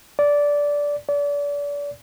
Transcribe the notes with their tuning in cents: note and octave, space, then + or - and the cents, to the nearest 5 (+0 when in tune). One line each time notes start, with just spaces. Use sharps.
D5 -15
D5 -35